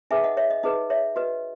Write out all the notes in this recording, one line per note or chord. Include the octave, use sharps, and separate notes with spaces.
D#4 G#4 B4 E5 G#5
D#5 F#5
C#5 E5
D#5
D#4 G#4 B4 D#5
C#5 E5
F#4 B4 D#5